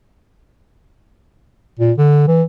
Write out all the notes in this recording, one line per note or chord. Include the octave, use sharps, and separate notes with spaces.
A#2
D3
E3